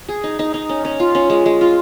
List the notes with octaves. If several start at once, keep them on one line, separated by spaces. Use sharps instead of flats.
G#4
D#4
D#4
D#4
C#4
C#4
F4
C#4
G#3
G#3
F4